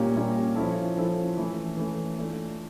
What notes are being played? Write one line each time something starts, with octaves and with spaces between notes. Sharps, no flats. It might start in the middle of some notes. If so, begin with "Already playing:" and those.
Already playing: A#2 G3 A#3 C#4 G4
A#2 G3 A#3 C#4 G4
F3 C#4 E4 A4
F3 C#4 E4 A4
E3 A3 C#4
E3 A3 C#4
A3 D4 F4